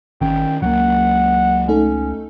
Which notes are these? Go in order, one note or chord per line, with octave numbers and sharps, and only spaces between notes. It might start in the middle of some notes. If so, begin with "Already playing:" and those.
G#1 D#3 C#4 G5
C#2 F#3 A#3 F#5
A3 C#4 D#4 A4